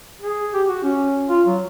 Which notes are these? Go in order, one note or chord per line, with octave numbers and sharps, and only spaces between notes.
G#4
G4
F#4
C#4
F4
F#3